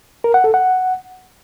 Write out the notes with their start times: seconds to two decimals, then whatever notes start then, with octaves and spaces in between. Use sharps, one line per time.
0.24 A#4
0.34 F#5
0.44 A4
0.54 F#5